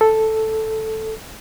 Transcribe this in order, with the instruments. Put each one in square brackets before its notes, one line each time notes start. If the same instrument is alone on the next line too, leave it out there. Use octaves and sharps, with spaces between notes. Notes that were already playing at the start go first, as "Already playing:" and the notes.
[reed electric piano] A4